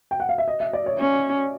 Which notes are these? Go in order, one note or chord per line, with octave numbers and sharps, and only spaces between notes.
G5
F#5
F5
E5
D#5
E5
D5
C#5
C#4